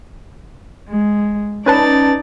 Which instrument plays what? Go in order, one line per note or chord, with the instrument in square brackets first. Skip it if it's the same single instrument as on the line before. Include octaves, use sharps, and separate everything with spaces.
[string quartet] G#3
[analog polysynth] C#4 B4 A5 [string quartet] D#4 D5 A6